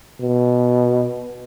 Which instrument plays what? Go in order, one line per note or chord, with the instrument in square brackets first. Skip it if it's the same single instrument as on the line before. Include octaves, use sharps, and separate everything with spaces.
[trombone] B2